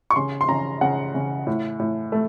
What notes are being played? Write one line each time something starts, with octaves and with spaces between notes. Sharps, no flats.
C#6
C#3 C6
C6
C#3 A#5
C#3 F#5
C#3
A2
A2
A3